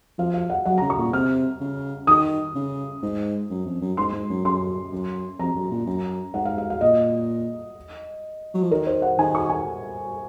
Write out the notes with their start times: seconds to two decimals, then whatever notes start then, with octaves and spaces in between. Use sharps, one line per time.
0.18 F3 F5
0.34 F5
0.50 F#5
0.65 F#3 F#5
0.78 C#3 A#5
0.90 C#6
0.97 A#2
1.13 C3 F6
1.61 C#3
2.07 D#3 D#6
2.55 C#3
3.02 G#2
3.50 F#2
3.66 F2
3.81 F#2
3.97 G#2 C6
4.13 G#2
4.29 F#2
4.45 F#2 C6
4.92 F#2
5.39 F2 A#5
5.55 F#2
5.71 A#2
5.87 F#2
6.34 G#2 F#5
6.45 F5
6.58 F5
6.70 F5
6.81 A#2 D#5
8.54 F#3
8.62 F3
8.71 D#3 A#4
8.87 C5
9.02 F#5
9.18 D#3 G#5
9.35 C#6
9.49 G#5